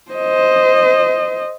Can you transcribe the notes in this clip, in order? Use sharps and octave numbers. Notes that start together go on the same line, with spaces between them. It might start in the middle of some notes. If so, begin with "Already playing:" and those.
C5 D#5